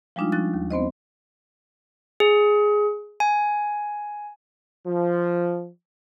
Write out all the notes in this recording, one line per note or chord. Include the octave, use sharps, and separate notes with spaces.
F3 G3 G#3 D4 D#4 F4
F3 C#4 F#6 A6
D#2
B3 C4 C5 D#5
G#4
G#5
F3